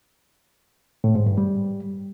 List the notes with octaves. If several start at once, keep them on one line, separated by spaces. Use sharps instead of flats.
A2
G#2
G2
G3